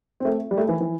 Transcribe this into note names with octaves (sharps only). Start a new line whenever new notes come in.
C4
A3
G3
A3
E3
E3